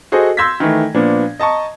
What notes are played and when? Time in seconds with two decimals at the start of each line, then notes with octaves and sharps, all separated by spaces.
0.12 F#4 G#4 A4 C5 D#5
0.37 C6 E6 G6 G#6 A#6 B6
0.60 D#3 E3 A3
0.94 A#2 F3 B3 D4
1.40 D#5 A5 A#5 C#6